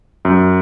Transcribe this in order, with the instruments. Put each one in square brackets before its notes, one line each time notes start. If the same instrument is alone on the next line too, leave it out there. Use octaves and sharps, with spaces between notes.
[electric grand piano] F#2